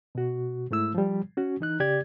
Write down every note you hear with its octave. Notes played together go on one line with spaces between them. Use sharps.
B2 F#4
G#2 A3 E4 E6
F3 G3
C#4 F#4
E3 D#4 F#6
C#3 G4 D5 G#6